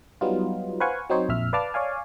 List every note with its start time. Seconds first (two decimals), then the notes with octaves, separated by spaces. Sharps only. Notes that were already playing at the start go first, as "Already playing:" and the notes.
0.21 F#3 G3 B3 D#4 F4
0.80 B4 C5 F5 F#5 G#5 C#6
1.10 F#3 C4 D#4 C5 C#5
1.29 A#1 F2 E5 F6
1.53 B4 D5 F5 A5 D6 F6
1.74 C#5 D5 F5 G#5